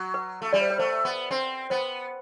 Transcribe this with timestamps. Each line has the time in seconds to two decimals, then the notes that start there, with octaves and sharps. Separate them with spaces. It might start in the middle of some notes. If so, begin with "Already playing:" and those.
Already playing: F#3
0.14 B4
0.42 A3
0.53 G3 D5
0.61 C5
0.70 B4
0.78 A3 C5
1.05 B3
1.31 C4 C5
1.70 B3 C5